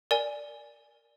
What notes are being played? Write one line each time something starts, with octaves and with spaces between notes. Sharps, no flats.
A#4 D5 G#5